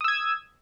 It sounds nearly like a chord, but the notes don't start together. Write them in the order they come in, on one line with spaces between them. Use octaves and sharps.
D#6 E6 G#6